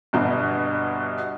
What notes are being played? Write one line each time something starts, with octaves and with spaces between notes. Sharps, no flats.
G1 G2 B2 B3